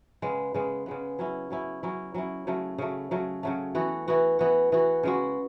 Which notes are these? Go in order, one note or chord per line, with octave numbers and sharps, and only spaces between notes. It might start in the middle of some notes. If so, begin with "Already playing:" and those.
C#3 G#3 B3
C#3 G#3 B3
C#3 G#3 B3
F#3 C#4 E4
F#3 C#4 E4
F#3 C#4 E4
F#3 C#4 E4
C#3 F#3 A3
C#3 F#3 A3
C#3 F#3 A3
C#3 F#3 A3
E3 B3 F#4
E3 B3 F#4
E3 B3 F#4
E3 B3 F#4
C#3 G#3 B3 F#4